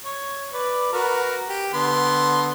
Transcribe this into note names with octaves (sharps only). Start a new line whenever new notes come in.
C#5
B4 D5
F#4 A#4 B4
G4
D3 B3 C6